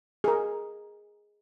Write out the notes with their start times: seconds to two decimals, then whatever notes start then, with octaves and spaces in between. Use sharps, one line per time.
0.24 G#4 A#4